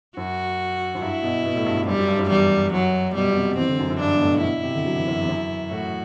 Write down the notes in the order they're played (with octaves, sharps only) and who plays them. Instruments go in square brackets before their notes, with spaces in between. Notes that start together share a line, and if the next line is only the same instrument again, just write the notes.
[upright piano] F#2 [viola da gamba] F#4
[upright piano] F#2
[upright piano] G2 [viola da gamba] E4
[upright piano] B2
B2
A2
G2
G2
[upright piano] F#2 [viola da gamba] G3
[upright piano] F#2
G2
F#2
[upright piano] E2 [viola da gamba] G3
[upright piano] F#2 [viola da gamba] F#3
[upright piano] B2 [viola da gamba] G3
[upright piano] B2
C3
[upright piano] E3 [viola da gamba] C4
[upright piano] D3
F#2
F#2
[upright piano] G2 [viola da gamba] D4
[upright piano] G2
B2
A2
A2
[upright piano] B2 [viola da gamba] E4
[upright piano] C3
D3
F#3
E3
F#2
E2
F#2
[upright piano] A2 [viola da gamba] F#4